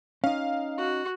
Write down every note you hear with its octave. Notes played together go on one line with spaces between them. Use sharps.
C#4 D#4 F5
F#4